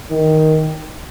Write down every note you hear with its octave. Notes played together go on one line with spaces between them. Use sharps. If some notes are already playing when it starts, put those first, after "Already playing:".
D#3